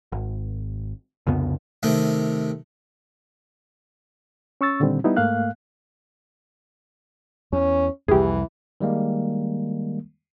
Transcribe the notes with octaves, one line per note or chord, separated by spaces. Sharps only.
G#1
C2 F2 C#3 B3
C3 D#3 A3
C#4 C#6 E6 A6
A#2 D3 D#3 G3 C4
G3 B3 D#4 E4
G#2 A3 A#3 F5 F#6
E2 C#4
C2 F2 E3 G4 G#4
D#3 G3 G#3 A#3